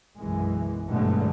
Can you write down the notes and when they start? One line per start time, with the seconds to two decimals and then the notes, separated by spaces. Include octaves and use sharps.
0.17 B1 F#2 E3 G#3
0.90 G2 B2 D3 F#3 G#3 A3